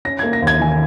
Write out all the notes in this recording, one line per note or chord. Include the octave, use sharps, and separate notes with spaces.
C#4 A#6
A#3 G#6
A#6
D#2
G#6
D#3 G#5